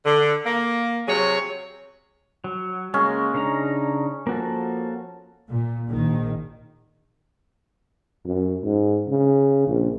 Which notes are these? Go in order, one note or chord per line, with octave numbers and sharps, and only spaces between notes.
D3
A#3
C3 F#3 G#4 C#5
F#3
C#3 G#3 A#3 C#4
C#3 D4 D#4 A#5
F3 A#3 F#4 A4
A#2
A#1 D#3
F#2
G#2
C#3
A#1